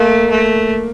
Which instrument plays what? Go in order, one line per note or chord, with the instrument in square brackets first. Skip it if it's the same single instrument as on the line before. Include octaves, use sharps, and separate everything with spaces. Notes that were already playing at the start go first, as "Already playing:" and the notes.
Already playing: [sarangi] A3 [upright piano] A#3
[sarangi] A3